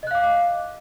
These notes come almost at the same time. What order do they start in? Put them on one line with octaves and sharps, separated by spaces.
D#5 F#6 F5 D6